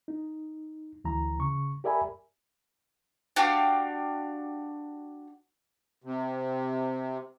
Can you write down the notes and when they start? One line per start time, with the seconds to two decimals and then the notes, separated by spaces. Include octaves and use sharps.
0.08 D#4
1.04 D2 E3 A#5
1.39 C#3 C#6
1.84 G4 A#4 D5 E5 G#5 B5
3.36 D4 F#4 G4 F5
6.04 C3